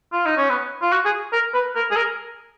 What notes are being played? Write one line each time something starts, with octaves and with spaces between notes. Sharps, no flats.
F4
D#4
C#4
B3
F4
F#4
G#4
A#4
B4
A#4
G#4
A#4